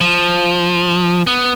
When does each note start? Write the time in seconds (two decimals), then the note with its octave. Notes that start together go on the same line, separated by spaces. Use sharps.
0.01 F3
1.27 B3